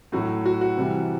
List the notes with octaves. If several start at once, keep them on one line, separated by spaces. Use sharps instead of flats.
A2 F#3 A3 F#4
F#4
F#4
C3 E3 G3